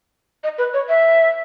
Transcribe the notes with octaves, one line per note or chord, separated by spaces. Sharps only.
D#5
B4
C#5
E5